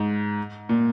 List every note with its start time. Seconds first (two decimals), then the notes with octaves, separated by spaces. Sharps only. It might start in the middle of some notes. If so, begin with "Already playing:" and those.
Already playing: G#2
0.69 A#2